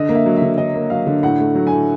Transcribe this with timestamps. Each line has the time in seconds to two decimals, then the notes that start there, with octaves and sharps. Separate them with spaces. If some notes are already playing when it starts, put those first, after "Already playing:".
Already playing: D3 D#5
0.09 A#3
0.15 E5
0.26 F#3
0.37 E5
0.42 D3
0.58 D3 D#5
0.74 A#3
0.90 F#3 F5
1.07 D3
1.23 A2 F#5
1.39 A3
1.55 F#3
1.67 A2 G#5